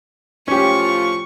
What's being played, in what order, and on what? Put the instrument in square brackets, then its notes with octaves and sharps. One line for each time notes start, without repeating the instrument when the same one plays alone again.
[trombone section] A2 F3 F4 [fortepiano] C#4 G4 [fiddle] C#6